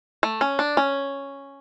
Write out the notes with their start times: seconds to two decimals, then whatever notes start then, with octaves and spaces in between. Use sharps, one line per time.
0.23 A3
0.41 C#4
0.59 D4
0.77 C#4